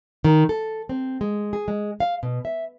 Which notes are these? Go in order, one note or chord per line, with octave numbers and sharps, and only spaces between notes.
D#3
A4
C4
G#3
G#4
G#3
F5
B2
E5